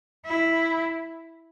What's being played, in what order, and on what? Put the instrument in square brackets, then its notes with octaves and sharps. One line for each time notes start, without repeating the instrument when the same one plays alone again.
[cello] E4